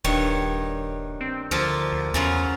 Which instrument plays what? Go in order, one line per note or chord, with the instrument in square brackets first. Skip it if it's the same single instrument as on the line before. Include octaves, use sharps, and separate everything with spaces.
[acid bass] D#1 [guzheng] G2 D#3 C#5
[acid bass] C4
[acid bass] D2 [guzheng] F3 A#3 A4
[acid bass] D2
[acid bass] E2 [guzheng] C#3 F#3 F4